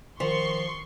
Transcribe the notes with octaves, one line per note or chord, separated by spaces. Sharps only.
D#3 F3 C6 C#6